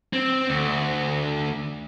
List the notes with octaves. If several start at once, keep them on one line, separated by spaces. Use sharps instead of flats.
C4
D2